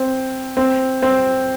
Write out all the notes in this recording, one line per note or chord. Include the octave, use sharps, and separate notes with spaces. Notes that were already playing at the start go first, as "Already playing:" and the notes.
Already playing: C4
C4
C4